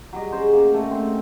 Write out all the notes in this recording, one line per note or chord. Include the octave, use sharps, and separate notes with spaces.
F#3 G3 D#5
C#4 G#4 C5
A#3 C#4
A3
C4